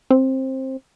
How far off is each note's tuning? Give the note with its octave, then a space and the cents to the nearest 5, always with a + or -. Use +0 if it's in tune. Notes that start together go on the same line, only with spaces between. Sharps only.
C4 +15